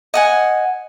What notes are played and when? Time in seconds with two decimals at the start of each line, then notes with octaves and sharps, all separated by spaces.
0.14 D#5 F#5 G#5